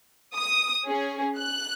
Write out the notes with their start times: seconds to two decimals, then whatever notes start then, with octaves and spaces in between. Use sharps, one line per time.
0.36 D#6
0.87 C#4 G#4
1.38 F#6